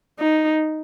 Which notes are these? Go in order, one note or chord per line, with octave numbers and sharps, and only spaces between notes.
D#4